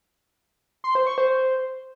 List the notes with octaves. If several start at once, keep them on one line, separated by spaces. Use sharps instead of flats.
C6
C5
C#6
C5